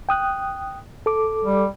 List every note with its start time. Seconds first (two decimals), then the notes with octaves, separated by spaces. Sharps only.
0.09 G5 D#6 F#6
1.06 A4 D6
1.44 G3